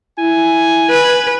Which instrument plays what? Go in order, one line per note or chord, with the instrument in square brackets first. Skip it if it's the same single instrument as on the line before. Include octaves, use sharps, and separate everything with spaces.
[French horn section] E4 [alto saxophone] G#5
[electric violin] B4